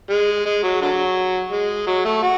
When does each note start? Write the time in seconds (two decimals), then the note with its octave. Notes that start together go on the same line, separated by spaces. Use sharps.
0.10 G#3
0.46 G#3
0.63 F#3
0.81 D3 F#3
1.51 G#3
1.87 F#3
2.05 A3
2.22 F#4